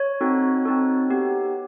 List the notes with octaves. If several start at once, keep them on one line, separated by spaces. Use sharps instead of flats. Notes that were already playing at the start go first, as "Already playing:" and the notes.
Already playing: C#5
C4 D#4 F#4 A4
C4 D#4 F#4 A4
B3 D#4 G4